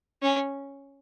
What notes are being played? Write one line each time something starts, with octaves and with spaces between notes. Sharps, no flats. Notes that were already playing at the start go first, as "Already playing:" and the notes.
C#4